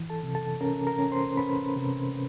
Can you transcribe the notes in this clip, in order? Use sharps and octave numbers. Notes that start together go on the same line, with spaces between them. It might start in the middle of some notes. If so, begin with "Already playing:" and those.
Already playing: E3
A4 A5
C3
A4 A5
C#4 A#4 A#5
A#4 A#5
C#4
C5 C6
C#4 B4 B5
C3